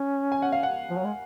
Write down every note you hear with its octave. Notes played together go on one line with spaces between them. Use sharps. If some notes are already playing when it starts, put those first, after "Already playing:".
Already playing: C#4
G#5
F#5
F5
F#5
F3
F#3
G#3